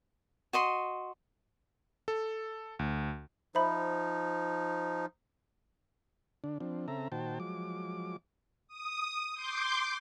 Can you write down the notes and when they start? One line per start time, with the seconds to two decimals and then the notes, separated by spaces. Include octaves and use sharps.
0.53 F#4 D#5 C6
2.08 A4
2.79 D2
3.55 F3 D#4 C5 E5 B5
6.44 D3 D4
6.60 F3 C4 D4
6.88 C#3 C4 A4 E5 A#5
7.12 A#2 D#3 F#4 C5 G5 A5
7.40 F3 F#3 G#3 D6
8.68 D#6
9.35 C6 D6 G6